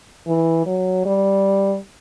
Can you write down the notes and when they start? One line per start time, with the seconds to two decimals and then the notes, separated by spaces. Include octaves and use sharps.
0.27 E3
0.66 F#3
1.05 G3